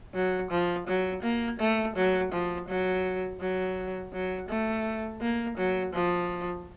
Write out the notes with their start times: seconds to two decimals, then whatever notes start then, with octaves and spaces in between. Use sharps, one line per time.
0.14 F#3
0.51 F3
0.87 F#3
1.23 A#3
1.60 A3
1.96 F#3
2.32 F3
2.68 F#3
3.40 F#3
4.13 F#3
4.49 A3
5.22 A#3
5.57 F#3
5.94 F3